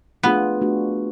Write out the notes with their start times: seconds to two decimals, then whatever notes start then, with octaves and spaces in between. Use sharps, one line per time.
0.23 A3 B3 D4 F4 G#4
0.61 A3 D4 F#4